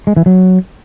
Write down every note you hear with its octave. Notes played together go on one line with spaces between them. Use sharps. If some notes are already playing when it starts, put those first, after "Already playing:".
G#3
E3
F#3